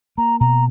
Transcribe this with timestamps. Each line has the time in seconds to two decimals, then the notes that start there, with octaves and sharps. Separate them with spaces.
0.18 A#3 A#5
0.40 B2 A#5